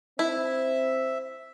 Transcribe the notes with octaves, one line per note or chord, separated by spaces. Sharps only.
C4 E4 E5